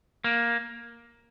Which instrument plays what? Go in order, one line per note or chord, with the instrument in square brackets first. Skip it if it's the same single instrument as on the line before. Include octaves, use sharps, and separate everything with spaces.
[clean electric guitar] A#3